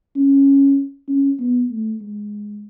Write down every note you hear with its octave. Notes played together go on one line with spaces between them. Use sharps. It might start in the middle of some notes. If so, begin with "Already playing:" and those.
C#4
C#4
B3
A3
G#3